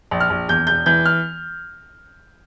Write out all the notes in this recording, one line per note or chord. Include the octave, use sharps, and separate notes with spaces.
A#1
F6
A#1
E2 G6
E1 G6
E3 G6
F6